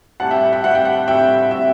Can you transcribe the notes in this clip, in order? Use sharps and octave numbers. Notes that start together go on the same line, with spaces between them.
A2 G3 C4 F#5 A5
E5 G5
E5 G5
A2 G3 C4 F#5
G5
F#5
A2 G3 C4 E5 G5
A2 G3 C4 E5